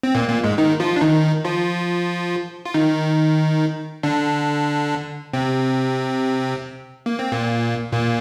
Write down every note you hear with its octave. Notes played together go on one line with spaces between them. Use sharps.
C4
A#2 A#3
A#2 A#3
G#2 G#3
D#3 D#4
F3 F4
D4
D#3 D#4
F3 F4
F4
D#3 D#4
D3 D4
C3 C4
A#3
C4
A#2 A#3
A#2 A#3